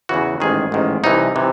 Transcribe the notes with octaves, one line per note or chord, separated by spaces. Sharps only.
E2 C#3 E3 F#4
A1 G#2 D#3 G#4
A1 G#2 D#3
C2 C3 E3 D#4
C3 E3